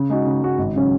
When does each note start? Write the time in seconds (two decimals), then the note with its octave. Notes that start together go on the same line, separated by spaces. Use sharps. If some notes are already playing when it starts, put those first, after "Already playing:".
Already playing: C#3
0.10 G#3 D#4 F#4
0.26 C#3
0.42 G#3 D#4 F#4
0.58 G#1
0.76 C#3 F#3 C#4